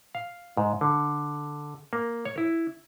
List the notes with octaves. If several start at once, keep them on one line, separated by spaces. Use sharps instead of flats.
F5
G#2
D3
A#3
C#5
E4